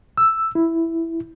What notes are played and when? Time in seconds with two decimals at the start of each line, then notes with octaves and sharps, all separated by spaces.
0.18 E6
0.55 E4